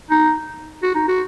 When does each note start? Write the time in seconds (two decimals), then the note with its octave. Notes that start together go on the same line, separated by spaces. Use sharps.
0.11 D#4
0.83 F#4
0.95 D#4
1.08 F#4